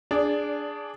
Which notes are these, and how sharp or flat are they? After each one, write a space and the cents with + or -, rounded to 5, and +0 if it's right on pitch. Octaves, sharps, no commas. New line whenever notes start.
D4 +0 G#4 +0 D5 -25